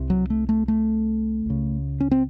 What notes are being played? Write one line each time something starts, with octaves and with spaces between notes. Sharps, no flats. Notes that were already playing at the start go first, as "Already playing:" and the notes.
Already playing: C2 C3
F#3
A3
A3
A3
C#2 C#3
C#4
C4